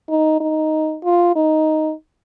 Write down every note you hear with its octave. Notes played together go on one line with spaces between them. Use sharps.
D#4
D#4
F4
D#4